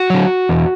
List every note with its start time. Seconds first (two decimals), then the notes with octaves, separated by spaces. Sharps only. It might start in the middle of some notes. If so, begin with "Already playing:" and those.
Already playing: F#4
0.10 D3 F#3
0.49 E2